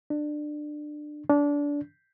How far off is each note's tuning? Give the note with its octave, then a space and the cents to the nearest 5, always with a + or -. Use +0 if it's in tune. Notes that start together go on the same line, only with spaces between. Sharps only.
D4 +20
D4 -25